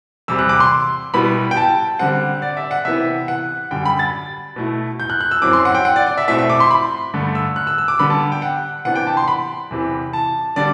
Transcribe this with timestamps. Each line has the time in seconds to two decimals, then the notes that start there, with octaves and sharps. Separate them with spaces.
0.28 E2 C3 G3 E6
0.39 F#6
0.49 D6
0.60 C6
1.14 B2 G3 B3 E4 B5
1.51 G5
1.57 A5
1.99 D3 G3 C4 F#5
2.42 D5
2.57 E5
2.71 F#5
2.85 C3 E3 B3 E4 E5
3.28 F#5
3.71 F#2 D3 G3 G5
3.86 B5
3.99 A6
4.56 B2 A3 E4
5.00 G6
5.10 F#6
5.21 F#6
5.31 E6
5.42 F#2 F#3 C4 E4 D6
5.53 C6
5.65 F#5
5.75 G5
5.85 F#5
5.96 D5
6.07 D5
6.18 E5
6.28 B2 A3 C4 E4 E5
6.38 E5
6.50 D6
6.60 C6
6.71 B5
7.13 G2 D3 A3
7.35 E6
7.56 F#6
7.67 E6
7.78 E6
7.88 D6
7.99 D3 G3 B3 D4 B5
8.10 A5
8.32 G5
8.42 F#5
8.85 C3 E3 B3 D4 F#5
8.95 G5
9.07 A5
9.17 C6
9.28 B5
9.71 E2 C3 E3
10.13 A5
10.56 D3 G3 D4 D5